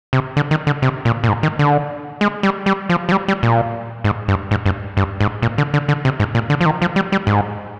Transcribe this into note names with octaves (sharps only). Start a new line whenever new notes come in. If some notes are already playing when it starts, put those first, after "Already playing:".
C3
D3
D#3
D3
C3
A#2
A#2
G#2
D#3
D3
G#3
G3
G3
F3
F3
G3
G3
A#2
G#2
G2
G#2
G2
G2
G#2
A#2
D3
D3
D3
C3
G#2
A#2
D3
F3
D#3
F3
G3
G3
G#2